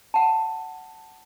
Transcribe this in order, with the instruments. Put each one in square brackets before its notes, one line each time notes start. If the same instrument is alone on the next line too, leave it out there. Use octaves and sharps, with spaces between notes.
[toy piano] F#5 A5